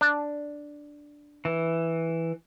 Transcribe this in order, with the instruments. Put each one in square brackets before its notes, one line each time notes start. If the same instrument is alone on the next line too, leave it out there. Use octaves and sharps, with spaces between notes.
[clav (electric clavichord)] D4
[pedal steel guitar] E3